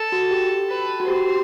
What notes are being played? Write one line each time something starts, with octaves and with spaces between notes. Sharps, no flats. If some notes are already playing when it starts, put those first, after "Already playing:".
Already playing: A4
F#4
G4
B4
F#4
G4 C5